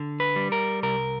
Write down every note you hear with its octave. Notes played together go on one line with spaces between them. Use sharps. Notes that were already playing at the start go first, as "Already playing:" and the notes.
Already playing: D3
B4
G3
A#4
C2 A#4